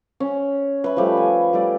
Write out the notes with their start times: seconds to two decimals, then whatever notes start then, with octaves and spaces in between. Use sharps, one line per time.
0.20 C#4
0.84 B4 E5
0.97 F3 G3 A3
1.17 G#5
1.53 G3 A3 A4 D5